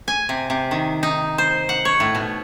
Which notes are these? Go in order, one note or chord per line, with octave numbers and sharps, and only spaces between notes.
G#5
C3
C3
D#3
D#4
C5
F#5
C#5
A2
B2